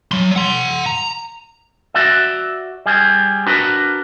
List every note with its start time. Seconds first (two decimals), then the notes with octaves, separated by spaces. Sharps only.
0.12 F#3 C6
0.36 F#5 C6
0.86 A#5
1.94 F#4 D5 E5
2.86 G3 G#4
3.47 D4 F#4 A#4 B4